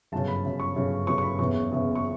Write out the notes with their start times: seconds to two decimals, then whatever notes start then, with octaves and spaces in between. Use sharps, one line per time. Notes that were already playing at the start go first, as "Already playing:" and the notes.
0.12 G1 F#2 C#3 A5
0.28 B5
0.45 G1 F#2 C#3
0.60 C#6
0.76 G1 F#2 C#3
1.07 G1 F#2 C#3 C#6
1.18 C#6
1.23 B5
1.39 F#1 E2 C#3 C#6
1.71 F#1 E2 C#3
1.95 C#6